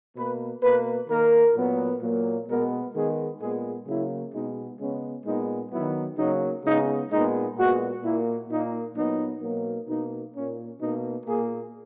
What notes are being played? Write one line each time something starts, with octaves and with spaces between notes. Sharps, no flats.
B2 A#3 B4
B2 A#3 B4
D#3 A#3 A#4
A#2 F#3 B3
A#2 F#3 A#3
B2 G#3 B3 A#4
D#3 G#3 B3 G#4
A#2 G#3 B3 G#4
C#3 F#3 A#3 E4
B2 G#3 B3 D#4
C#3 G#3 B3 C#4
A#2 G#3 B3 D#4
D#3 F#3 B3 E4
C#3 F#3 A#3 D#4
C#3 G#3 B3 D#4
A#2 G#3 B3 D#4
A#2 G#3 B3 F#4
A#2 A#3 E4
A#2 A#3 D#4
A#2 F#3 B3 D#4
B2 F#3 A#3
B2 A#3 D#4
A#2 A#3 C#4
B2 A#3 D#4
A#2 A#3 G#4